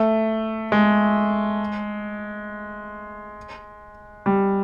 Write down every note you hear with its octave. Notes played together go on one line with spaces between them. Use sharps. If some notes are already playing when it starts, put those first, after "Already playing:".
Already playing: A3
G#3
G3